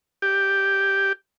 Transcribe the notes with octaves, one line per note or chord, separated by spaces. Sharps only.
G4